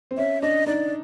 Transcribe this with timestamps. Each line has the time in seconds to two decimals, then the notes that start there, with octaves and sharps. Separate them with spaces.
0.11 C4
0.17 C#4 E5
0.42 D4 D#5
0.66 D#4 D5